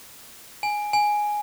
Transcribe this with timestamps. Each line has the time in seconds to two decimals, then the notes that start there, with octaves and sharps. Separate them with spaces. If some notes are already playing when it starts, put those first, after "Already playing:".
0.63 G#5
0.93 G#5